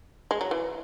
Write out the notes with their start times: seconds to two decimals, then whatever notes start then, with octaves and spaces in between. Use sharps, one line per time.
0.31 G#3
0.41 F#3
0.51 E3